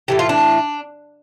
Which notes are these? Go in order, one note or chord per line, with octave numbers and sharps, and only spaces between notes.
A2 E3 A3 G4
F4
D4